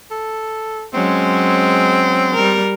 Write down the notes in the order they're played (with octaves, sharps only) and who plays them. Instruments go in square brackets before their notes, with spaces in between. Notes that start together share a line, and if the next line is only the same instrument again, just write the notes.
[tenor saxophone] A4
[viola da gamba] F#3 G#3 C#4 [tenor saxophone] C4
[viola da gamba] G3 A#4